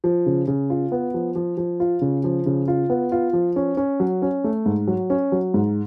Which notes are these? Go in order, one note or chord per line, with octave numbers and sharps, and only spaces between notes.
F3
C#3
C#3
F4
B3
F3
F3
F3
F4
C#3
F3
C#3
F4
B3
F4
F3
C#4
C#4
F#3
C#4
A3
G#2
F#3
C#4
F#3
G#2